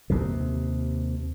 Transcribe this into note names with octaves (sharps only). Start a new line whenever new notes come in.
D#2 C3